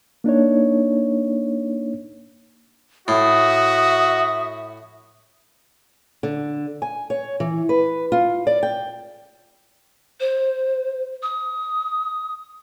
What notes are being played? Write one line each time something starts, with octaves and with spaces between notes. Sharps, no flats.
A#3 D4 D#4 C#5
A2 F#4 E5 D#6
D3
G#5
C#5
E3
B4
F4
D5
G5
C5
D#6